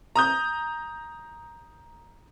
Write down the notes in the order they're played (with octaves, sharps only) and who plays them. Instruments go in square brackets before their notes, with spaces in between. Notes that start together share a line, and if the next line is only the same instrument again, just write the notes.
[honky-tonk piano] A#5 D#6 G6